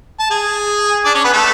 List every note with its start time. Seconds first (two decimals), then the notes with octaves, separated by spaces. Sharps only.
0.20 A5
0.31 G#4 G#5
1.05 D4 D5
1.14 C#4 C#5
1.24 B3 B4
1.33 A3 A4